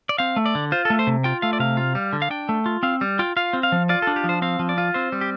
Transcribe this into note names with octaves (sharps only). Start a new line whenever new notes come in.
D5
C4 F5
A3
D5
D3
F4 C5
A4
A3
C5
C3
F4 G5
A3 F5
D5
C3 F5
F4
G3
D3
F5
D4 G5
A3
F4
C4 F5
G3
F4 G5
F4 F5
C4
F5
F3
F4 D5
A4
D4
G4
F3 C5
C4 F5
F3
D5
F4
C4 C5
G3
G4